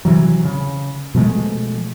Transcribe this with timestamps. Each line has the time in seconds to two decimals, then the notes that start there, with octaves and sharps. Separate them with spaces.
0.05 C3 E3 F#3
0.45 C#3
1.14 B2 F3 G#3 A3